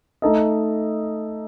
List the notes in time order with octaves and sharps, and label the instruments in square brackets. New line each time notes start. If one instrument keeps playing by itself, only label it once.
[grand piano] A3 D#4 A4 D#5